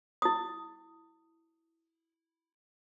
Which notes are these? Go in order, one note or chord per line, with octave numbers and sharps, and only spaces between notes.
E4 D#6